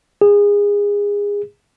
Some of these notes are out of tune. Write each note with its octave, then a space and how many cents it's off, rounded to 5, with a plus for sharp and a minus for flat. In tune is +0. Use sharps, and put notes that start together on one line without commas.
G#4 -25